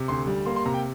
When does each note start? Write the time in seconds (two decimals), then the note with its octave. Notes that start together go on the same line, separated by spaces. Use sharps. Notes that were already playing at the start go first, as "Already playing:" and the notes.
Already playing: C3
0.08 D2 C6
0.27 G3
0.46 A#3 C6
0.56 C6
0.66 C3 A#5
0.74 G5